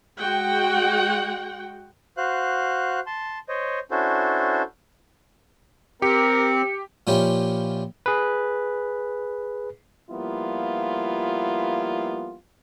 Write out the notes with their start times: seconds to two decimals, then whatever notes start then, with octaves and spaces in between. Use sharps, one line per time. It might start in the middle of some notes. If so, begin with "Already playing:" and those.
0.19 G#3 F#4 F#5 G5
2.17 F#4 C5 F5 F#6
3.06 A5 C6
3.49 C5 C#5 D#5
3.91 C#4 D4 E4 F#4 A4 C5
6.02 C4 G4 A#4 C#7
7.07 A#2 F3 C#4 E4 F4 G4
8.06 G#4 B4
10.10 F3 G3 A#3 B3 E4 F4